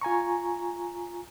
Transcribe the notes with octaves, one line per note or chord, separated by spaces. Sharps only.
F4 G#5 A#5 C#6